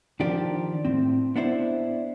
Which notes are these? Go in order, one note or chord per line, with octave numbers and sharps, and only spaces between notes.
D#3 F3 D4 G4
A2 C4
B3 D4 E4 C5